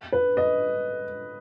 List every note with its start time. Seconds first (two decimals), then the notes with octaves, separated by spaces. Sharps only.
0.12 B4
0.37 D#5